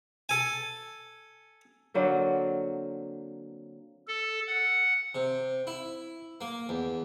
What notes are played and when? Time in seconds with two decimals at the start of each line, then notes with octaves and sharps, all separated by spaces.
0.29 A4 G#5
1.94 D3 F#3 A#3 C4
4.08 A4
4.47 F#5
5.15 C3
5.67 E4
6.41 A#3
6.69 E2